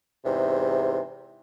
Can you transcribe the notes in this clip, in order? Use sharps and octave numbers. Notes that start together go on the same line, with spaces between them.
E2 G#2 C3